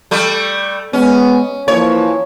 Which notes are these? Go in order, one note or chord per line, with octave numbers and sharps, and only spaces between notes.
G3 A3
G#3 B3 C#4
E3 F3 A#3 C#5